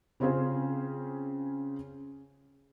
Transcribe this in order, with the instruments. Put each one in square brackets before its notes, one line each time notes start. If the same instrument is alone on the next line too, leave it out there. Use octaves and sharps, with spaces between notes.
[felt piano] C#3 C4 C#4 F4 G#4 C5